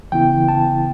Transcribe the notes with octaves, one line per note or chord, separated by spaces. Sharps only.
C#3 E3 B3 E4 G5
A5